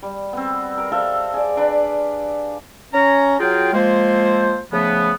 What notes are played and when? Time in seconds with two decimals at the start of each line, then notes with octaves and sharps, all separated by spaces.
0.03 G3
0.33 B3 C4
0.78 A#4
0.92 A4 C5 E5 F5
1.34 G#4 D5
1.57 D4 B4 B5
2.93 C#4 C#5 A#5
3.40 F#3 F4 G#4 A#4 G5
3.74 F3 G#3 A#3 A4 C5
4.72 C#3 F3 A3 B3